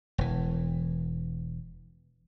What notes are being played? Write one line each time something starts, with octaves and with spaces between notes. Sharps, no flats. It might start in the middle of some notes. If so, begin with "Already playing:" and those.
E1 E3